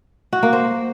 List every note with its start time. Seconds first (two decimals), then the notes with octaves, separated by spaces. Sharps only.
0.33 F#4
0.43 A#3
0.53 C5